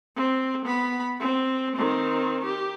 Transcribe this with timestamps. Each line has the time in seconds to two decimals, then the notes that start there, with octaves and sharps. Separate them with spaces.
0.16 C4
0.66 B3 B5
1.20 C4
1.76 D#3 C4
2.45 G4